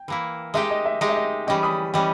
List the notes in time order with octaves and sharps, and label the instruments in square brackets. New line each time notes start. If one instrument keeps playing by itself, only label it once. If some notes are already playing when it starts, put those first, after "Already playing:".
Already playing: [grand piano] G5
[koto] E3 A#3 E4
[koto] G#3 D#4 G4 [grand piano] E5
[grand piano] D#5
E5
[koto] G#3 D#4 G4 [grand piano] D#5
[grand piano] E5
D#5
[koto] E3 G3 C#4 [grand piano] D#5 G5
[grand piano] B5 D#6
[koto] E3 G3 C#4 [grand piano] D#5 G5